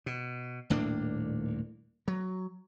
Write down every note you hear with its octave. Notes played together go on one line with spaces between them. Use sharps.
B2
D#1 A2 A#3 D4
F#3